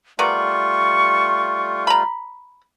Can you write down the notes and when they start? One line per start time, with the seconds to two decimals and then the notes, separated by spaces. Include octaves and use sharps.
0.19 G3 A3 B3 F4 A#4 D5 C#6
1.87 A#5 B5